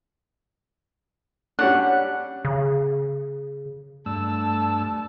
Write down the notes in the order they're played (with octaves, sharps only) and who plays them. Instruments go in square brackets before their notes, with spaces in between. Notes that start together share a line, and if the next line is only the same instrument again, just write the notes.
[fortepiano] G3 C#4 D4 [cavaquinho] F#5
[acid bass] C#3
[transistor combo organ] G2 E6 [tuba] A3 [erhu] A5